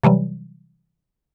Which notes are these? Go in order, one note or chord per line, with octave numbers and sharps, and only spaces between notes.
C3 E3 F#3 G3